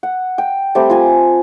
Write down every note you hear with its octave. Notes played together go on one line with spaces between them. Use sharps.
F#5
G5
G3 A3 C4 G4
F4 G#5 A#5